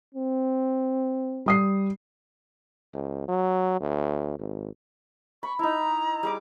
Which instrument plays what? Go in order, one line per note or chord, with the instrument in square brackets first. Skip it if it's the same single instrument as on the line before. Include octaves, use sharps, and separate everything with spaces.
[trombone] C4
[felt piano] G3 D#6 C7
[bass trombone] C#2
F#3
D2
G#1
[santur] B5 [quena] C#6
[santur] D#4 E4 [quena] A#5
[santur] G3 G#4 D6